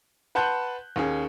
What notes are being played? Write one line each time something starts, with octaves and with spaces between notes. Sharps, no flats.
B4 F#5 A5 C6 F#6 G6
D#2 C#4 G#4